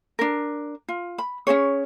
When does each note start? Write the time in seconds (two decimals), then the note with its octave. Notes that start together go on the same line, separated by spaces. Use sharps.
0.19 D4 A#4
0.89 F4
1.18 B5
1.47 C#4 E4 G#4 C#5